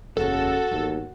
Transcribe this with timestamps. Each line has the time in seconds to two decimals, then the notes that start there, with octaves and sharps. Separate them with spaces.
0.17 F#1 E2 C#3 F#4 A4
0.71 G1 D#2